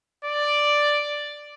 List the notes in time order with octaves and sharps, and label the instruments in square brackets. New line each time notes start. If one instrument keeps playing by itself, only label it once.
[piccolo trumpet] D5